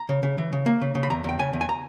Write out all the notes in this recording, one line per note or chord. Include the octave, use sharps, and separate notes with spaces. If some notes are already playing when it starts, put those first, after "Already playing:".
Already playing: A#5
C#3
C#3
E3
C#3
A#3
C#3
C#3
B5
E2 A#5
E2 G5
C#3 G#5
E2
G#5
A#5